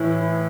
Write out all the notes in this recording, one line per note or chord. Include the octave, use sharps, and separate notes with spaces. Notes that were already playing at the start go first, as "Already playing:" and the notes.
Already playing: A2 E3 E4